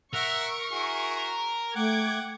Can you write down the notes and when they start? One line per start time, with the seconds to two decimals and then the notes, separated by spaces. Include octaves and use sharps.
0.14 A#4 E5 F#5 C#6
0.72 E4 F#4 G#4
1.76 A3 F#5 G5 D6 G#6